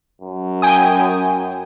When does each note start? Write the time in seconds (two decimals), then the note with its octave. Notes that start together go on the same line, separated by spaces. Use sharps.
0.21 F#2
0.62 G5 G#5 D#6